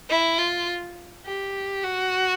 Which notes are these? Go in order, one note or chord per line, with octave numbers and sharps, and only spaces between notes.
E4
F4
G4
F#4